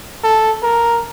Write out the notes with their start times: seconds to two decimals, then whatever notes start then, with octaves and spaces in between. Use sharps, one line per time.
0.24 A4
0.63 A#4